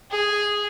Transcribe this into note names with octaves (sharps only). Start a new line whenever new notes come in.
G#4